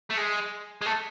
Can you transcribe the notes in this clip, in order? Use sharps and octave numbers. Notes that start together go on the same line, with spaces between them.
A3
G#3
G#3
A3